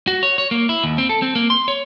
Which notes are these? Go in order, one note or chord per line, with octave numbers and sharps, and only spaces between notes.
F#4
C#5
C#5
A#3
E4
D#2
C4
A4
C4
A#3
C6
C#5